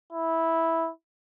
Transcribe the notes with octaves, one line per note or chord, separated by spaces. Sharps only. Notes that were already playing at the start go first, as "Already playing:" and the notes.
E4